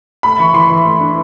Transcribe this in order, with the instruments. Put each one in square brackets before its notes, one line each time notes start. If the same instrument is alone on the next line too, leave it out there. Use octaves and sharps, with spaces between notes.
[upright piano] A3 B5
E3 C#6
E3 C6
E3
A3
D4